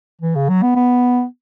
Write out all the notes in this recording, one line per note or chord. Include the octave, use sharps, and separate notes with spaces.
E3
C#3
F#3
B3
B3